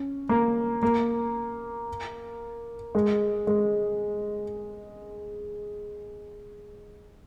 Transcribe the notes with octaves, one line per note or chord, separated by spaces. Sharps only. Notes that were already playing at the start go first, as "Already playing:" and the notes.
Already playing: C#4
A#3
A#3
G#3
G#3